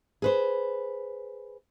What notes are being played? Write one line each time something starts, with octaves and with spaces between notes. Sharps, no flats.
G#4 B4 C5